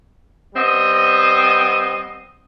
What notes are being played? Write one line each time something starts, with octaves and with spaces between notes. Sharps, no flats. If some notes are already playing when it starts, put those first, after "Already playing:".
G3 B3 C4 D#5